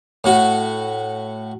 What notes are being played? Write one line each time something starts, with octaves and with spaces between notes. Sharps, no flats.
A2 F#4